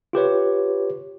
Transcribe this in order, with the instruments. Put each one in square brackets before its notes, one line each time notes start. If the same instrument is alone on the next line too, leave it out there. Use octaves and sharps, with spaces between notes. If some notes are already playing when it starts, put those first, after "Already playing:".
[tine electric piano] F4 G4 B4 C#5